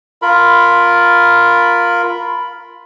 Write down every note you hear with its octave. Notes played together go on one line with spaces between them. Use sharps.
F4 A#4 B5